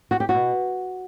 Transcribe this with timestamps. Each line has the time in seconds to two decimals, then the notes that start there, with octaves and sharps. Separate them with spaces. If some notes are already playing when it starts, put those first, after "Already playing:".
0.11 F#4
0.20 G4
0.29 F#4
0.34 B2